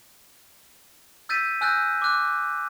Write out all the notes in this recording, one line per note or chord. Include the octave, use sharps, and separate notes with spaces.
E6 G6 A6 B6 D#7
G#5 E6 F#6 G6 A6 A#6
D6 F#6